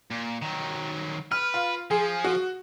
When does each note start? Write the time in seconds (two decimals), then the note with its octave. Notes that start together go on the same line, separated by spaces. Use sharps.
0.10 A#2
0.42 D#3 F#3
1.32 B4 F6
1.54 F4
1.91 F3 G#4
2.24 F#4